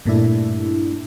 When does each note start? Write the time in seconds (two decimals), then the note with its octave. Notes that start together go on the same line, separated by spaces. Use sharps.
0.05 G2 A#2 A3 D4 E4